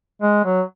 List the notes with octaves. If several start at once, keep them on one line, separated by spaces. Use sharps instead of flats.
G#3
F#3